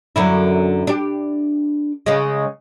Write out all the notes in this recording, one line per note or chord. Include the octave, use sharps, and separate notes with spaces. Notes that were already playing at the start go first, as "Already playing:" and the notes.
F#2 D3 E4
D4 G4
C#3 G#3